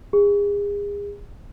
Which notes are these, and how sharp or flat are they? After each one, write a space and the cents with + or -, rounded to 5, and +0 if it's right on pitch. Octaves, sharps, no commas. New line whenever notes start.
G#4 -35